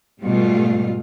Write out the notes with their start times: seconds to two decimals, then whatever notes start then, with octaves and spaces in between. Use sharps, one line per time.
0.21 G#2 B2 G3 A3 F4